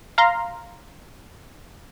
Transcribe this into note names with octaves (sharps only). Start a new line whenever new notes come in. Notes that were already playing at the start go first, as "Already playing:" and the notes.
F5 A#5 C6